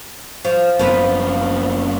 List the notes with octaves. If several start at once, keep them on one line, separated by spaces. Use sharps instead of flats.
F3
F#1 F3 B3 B4